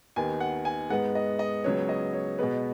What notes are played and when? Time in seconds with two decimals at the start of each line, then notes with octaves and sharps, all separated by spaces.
0.16 D#2 D#3 B3 G#5
0.40 F#5
0.65 G#5
0.90 G#2 G#3 B3 F#5
1.15 D#5
1.39 D#5
1.64 C#2 C#3 F#3 B3 C#5
1.89 D#5
2.13 C#5
2.39 B2 G#3 B3 B4